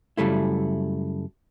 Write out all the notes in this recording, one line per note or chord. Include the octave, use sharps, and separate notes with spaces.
F#2 C#3 G3 A3 E4